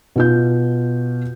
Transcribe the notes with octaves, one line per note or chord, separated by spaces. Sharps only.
B2 F4 G6